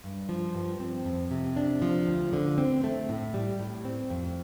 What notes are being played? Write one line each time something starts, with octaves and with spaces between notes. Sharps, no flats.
G2
F3
G2
C4
F2
C3
D4
F3
D2
D3
C4
A3
A2
G3
A2
C4
F2